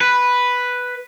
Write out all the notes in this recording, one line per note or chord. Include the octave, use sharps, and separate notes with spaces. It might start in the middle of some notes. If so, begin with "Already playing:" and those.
B4